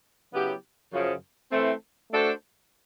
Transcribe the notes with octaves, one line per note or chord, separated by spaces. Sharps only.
C#3 F#3 B3 E4 G4
F#2 C#3 F3
E3 A3 C4
A3 D4 F#4 A4 C5